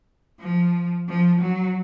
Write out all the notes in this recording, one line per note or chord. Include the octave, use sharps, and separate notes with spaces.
F3
F3
F#3